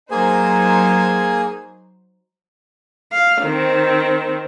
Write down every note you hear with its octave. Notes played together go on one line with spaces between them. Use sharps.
F#3 A#3 D#4 G#4 C5 G#5
F5
D#3 C4